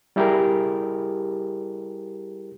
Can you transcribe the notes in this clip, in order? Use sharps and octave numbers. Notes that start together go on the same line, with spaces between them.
G3 E4 G4 G#4 A#4